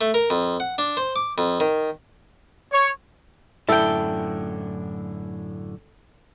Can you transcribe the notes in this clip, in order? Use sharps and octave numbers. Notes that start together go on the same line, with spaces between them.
A3
A#4
F2
F#5
D4
C5
D6
F2
D#3
C#5
F#2 A2 D3 E4 A4 G5